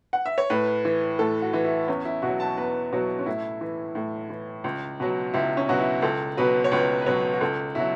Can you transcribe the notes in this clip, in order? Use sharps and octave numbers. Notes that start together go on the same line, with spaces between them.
F#5
E5
C#5
A2 B4
E3
A2 A4
F#4
E3
E4
E2 C#4
E4
B2 F#4
F#3
A5
E2 B4
B2 F#3
C#4
A2 E4
E3
A2
E3
C#2
B2 F#3
C#2 E4
C#4
B2 F#3 F#4
E4
C#2 A4
B2 F#3 B4
C#5
C#2 B4
B4
B2 F#3 C#5
F#4
C#2 A4
B2 F#3 E4